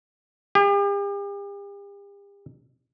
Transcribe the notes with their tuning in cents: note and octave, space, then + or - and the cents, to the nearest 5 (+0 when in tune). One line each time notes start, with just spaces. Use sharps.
G4 +40